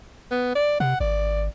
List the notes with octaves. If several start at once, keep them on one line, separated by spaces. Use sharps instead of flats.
B3
D5
C3 F#5
G#1 D5